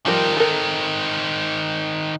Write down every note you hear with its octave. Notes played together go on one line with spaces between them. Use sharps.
D#3 F3 G3 C4 A#4
A4 A#4